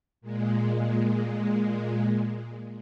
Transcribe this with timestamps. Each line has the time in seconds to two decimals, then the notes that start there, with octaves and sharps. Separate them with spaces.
0.21 A#2 G#3